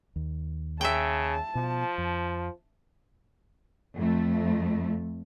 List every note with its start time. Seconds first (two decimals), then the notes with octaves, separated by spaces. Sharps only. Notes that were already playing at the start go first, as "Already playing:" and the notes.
0.16 D#2
0.81 C#3 E5 G5 A5
1.55 B2 F3
1.98 F2
3.97 F2 A3